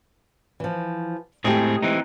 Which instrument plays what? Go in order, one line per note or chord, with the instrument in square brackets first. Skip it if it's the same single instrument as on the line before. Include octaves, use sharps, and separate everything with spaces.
[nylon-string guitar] E3 F3
[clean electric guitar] A2 C4 G#4 [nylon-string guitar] G#3 A3 G4
[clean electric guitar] E3 C4 D#4